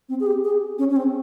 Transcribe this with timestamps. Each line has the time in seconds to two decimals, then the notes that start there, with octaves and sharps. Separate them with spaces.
0.09 C4
0.20 G#4
0.26 G4
0.44 G#4
0.79 C#4
0.90 C#4
0.96 C4